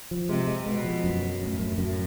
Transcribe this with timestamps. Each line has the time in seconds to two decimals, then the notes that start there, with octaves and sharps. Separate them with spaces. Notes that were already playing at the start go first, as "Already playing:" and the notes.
0.11 F3
0.29 C3 G#3
0.47 G#3
0.66 B2 G#3
0.84 F3
1.04 F#2
1.22 F#3
1.40 F#2 A2
1.59 F#2
1.78 F#2